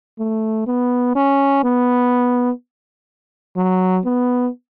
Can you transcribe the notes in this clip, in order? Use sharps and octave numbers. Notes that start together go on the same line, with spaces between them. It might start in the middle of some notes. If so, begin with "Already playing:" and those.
A3
B3
C#4
B3
F#3
B3